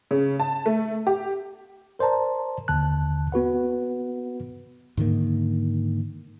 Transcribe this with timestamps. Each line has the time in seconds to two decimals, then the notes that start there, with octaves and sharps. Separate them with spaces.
0.11 C#3
0.40 A5
0.66 A3
1.07 G4
1.99 A#4 C5 D5 A5 A#5
2.68 D#2 D3 A5 F#6
3.32 B3 F#4 B4 F#5
4.97 G#2 D3 D#3 A#3